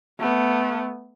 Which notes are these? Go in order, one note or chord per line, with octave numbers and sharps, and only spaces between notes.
A3 B3